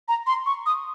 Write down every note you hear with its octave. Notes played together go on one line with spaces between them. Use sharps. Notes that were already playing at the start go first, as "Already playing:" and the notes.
A#5
C6
C#6
D#6